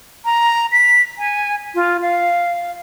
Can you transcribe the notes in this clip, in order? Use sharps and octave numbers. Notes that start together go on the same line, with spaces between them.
A#5
B6
G#5
F4
F5